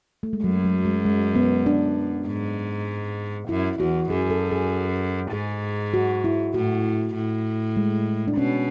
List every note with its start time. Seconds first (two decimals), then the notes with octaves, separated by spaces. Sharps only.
0.23 A3
0.33 G#3
0.43 F#2 F#3
0.64 F#3
0.85 G#3
1.05 G#3
1.35 B3
1.66 D4
2.27 G#2
3.49 F#2 E4
3.80 E2 F#4
4.10 F#2 G#4
4.30 A4
4.51 G#4
5.32 G#2 G#4
5.94 F#4
6.24 E4
6.54 A2 F#4
7.15 A2
7.77 G#3
8.28 D4
8.37 B2 C#4